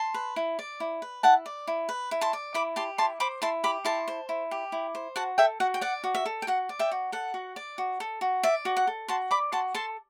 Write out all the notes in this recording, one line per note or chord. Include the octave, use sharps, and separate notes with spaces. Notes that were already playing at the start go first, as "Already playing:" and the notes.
Already playing: A5 C6
B4
E4
D5
E4
B4
E4 F#5 A5
D5
E4
B4
E4
A5 C6
D5
E4 B5 D6
G4 A5 C6
E4 A5 C6
C5 B5 D6
E4 A5 C6
G4 B5 D6
E4 A5 C6
C5
E4
G4
E4
C5
F#4 F#5 A5
A4 E5 G5
F#4 F#5
G5
D5 F#5
F#4
E5
A4
G5
F#4 F#5
D5
E5 G5
F#4
A4 F#5
F#4
D5
F#4
A4
F#4
D5 E5
F#4
F#5
A4
F#4 A5 C6
D5 B5 D6
F#4 A5 C6
A4 A5 C6